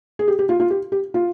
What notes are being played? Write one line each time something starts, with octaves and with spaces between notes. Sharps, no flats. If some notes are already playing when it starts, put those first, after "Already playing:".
G#4
G4
G4
F4
F4
G4
G4
F4